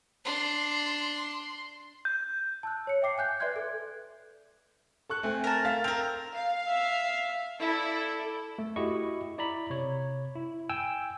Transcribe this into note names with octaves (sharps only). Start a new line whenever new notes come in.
D4 C6
G6
A5 E6 F#6
C#5 C#7
E5 G5 D6 C7
F5 G#5 F#6 G6
B4 D5 E5 C6 F#6 G#6
A4
A4 C#6 F#6
A3 C4 G#5
A#4 A5
F5 A6 B6
C4 A#4 F7
F5
E5
E4 A4 D5
A3
E4 F#4 G4 D#5 C#6
E4 D5 A#5 B5
C3 C#5
E4
G5 G#5 E6